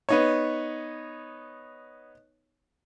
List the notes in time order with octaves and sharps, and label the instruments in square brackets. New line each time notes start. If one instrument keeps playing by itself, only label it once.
[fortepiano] B3 D#4 C#5